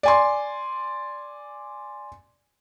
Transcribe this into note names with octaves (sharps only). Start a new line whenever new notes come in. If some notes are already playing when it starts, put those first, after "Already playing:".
D5 G#5 C6